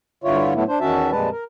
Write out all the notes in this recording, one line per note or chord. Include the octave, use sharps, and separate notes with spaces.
G2 D3 E4 F4 C#5
A2 F#3 A3 B3 E4
D4 C5
E2 D#3 C#4 F#4 E5 A5
F2 A#2 G3 G#3 B4 A5
A#4